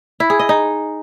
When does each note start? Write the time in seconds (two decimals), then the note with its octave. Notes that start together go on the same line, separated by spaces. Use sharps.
0.20 E4
0.30 G#4
0.39 D#5
0.49 D#4